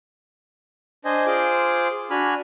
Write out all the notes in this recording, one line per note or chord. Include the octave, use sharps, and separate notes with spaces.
D4 C5 D#5 G#5
F4 G#4 C5 D6
D4 F#4 G#5 B5 F6